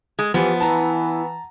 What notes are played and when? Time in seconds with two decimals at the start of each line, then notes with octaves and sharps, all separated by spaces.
0.19 G#3
0.34 E3 F3 B3 G4
0.60 E3 E4 A5 A#5